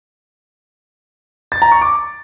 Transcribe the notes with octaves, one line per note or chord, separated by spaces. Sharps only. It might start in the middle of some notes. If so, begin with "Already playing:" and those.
A6
A#5
C#6
D6